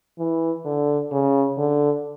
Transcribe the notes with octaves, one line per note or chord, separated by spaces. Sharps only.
E3
D3
C#3
D3